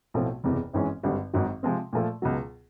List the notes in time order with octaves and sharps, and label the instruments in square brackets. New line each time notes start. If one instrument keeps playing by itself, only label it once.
[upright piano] B1 A2 F3 A3 C4
F#1 E2 C3
G#1 G#2 E3 G#3 C#4
G#1 G2 D3 G3
G#1 G#2 D#3 F#3
C3 F3 G#3 C4
A#2 F3 A3
C#2 B2 F#3